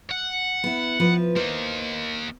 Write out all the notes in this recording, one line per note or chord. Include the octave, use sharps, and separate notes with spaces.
F#5
B3 E4
F3 B4
A#3 D#4 C5